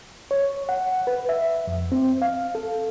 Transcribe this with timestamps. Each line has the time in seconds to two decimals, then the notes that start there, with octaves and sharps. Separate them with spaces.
0.31 C#5
0.69 F#5
1.07 B4
1.29 E5
1.67 F2
1.92 C4
2.22 F5
2.55 A4